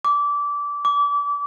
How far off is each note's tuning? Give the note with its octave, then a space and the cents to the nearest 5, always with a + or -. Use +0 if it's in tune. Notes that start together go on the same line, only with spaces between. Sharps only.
D6 -20
D6 -30